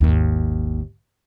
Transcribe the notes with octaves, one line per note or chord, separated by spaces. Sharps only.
G#1 D#2